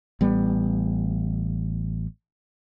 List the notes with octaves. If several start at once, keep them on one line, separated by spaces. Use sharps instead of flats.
A1 G3 B3